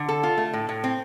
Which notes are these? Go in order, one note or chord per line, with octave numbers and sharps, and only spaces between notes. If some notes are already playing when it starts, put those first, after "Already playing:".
Already playing: D3
A4
F4
A3
A2
A2
C4